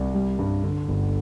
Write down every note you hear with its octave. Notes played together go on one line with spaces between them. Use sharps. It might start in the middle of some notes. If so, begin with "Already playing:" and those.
Already playing: C2
G3
G2
D3
G1